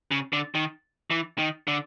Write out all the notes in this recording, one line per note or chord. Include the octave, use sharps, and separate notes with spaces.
C#3
D3
D#3
E3
D#3
D3